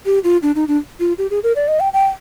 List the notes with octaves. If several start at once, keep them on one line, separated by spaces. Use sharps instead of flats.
G4
F4
D4
D#4
D4
F4
G4
G#4
A#4
D5
D#5
G5
G5